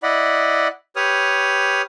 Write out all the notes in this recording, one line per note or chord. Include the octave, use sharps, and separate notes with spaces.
E4 D5 D#5 F#5 B5
G4 B4 C#5 D#6 F6